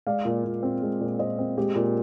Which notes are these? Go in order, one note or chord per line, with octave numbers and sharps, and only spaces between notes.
G#3 D5 F5
A#2
A#2
C4
G#3
A#2
A#2 C5 D#5
C4
G#3 G4
A#2